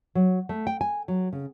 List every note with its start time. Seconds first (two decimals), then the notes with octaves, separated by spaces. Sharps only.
0.15 F#3
0.49 A3
0.67 G5
0.81 G#5
1.08 F#3
1.33 C#3